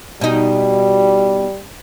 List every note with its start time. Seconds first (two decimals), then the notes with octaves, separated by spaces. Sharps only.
0.21 B2 G3 D#4